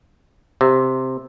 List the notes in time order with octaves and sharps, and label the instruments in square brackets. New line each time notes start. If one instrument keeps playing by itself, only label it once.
[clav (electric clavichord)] C3